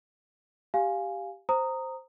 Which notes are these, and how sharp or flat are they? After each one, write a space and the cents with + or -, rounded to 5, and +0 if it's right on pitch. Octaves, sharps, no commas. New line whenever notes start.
G4 +0 F5 +0 G#5 +0
C5 +0 A#5 -15 D#6 +0